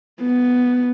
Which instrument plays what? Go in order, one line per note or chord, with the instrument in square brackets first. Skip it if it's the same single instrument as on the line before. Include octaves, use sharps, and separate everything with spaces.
[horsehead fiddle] B3